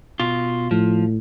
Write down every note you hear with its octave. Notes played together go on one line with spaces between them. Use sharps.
B2 F4
A2 F3